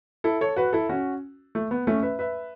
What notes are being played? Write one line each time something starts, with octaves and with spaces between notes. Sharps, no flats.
E4 A4
A4 C#5
F#4 B4
E4 A4
C#4 F#4
A3
B3
A3 C#4
B4 E5
B4 E5